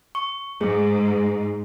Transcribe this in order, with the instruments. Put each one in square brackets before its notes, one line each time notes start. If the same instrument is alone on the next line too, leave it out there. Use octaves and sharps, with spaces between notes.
[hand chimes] C#6
[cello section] G#2 [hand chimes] A3 G#4